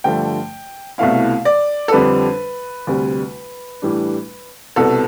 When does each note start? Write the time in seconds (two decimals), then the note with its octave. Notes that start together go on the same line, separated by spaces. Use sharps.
0.04 G2 D3 F3 A3 G5
0.98 C2 B2 A3 E4 F5
1.45 D5
1.88 A4
1.92 F2 D3 G3 D4 B4
2.87 D2 C3 G3
3.82 A2 E3 G3 D4
4.76 C2 B2 B3 A4